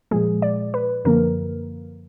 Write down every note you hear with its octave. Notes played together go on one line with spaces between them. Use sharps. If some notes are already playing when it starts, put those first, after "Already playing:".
A#2 F3 G#3 G#4
D5
B4
F#2 D3 F3 A#3 A#4